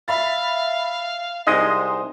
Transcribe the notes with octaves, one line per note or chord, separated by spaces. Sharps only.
E5 F5 B5 A6
C2 G#3 D#4 C5 D#5 D#6